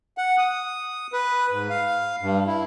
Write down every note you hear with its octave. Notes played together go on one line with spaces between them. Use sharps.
F#5
D#6
B4
G#2
F5
G2
E4